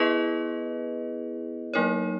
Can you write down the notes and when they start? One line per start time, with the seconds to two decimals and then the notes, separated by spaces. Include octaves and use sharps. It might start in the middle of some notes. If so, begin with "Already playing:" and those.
Already playing: B3 E4 G#4 B4 D#5
1.74 F#3 A#3 D#4 A#4 C#5